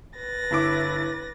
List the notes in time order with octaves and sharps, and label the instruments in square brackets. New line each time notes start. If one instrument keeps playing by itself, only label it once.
[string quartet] B4 A6 A#6
[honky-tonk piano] G1 E4 D6